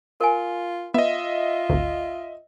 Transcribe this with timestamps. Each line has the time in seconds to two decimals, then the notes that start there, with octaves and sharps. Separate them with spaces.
0.21 F4 A#4 G#5
0.94 B3 F4 D#5 E5
1.69 G#1 D2